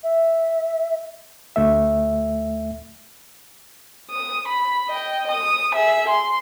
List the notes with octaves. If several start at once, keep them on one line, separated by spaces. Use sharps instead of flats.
E5
D2 A3 E5
D#6
B5
D#5 G5
D#6
G#4 E5
C6